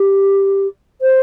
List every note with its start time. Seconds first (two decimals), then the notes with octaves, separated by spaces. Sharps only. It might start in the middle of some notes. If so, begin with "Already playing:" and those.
Already playing: G4
1.01 C5